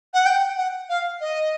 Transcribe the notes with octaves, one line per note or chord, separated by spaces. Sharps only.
F#5
G5
F#5
F5
D#5